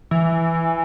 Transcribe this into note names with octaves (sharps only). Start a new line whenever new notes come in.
E3